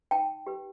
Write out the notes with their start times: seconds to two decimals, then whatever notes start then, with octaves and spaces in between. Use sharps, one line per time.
0.11 D#4 G5 A5
0.47 G4 B4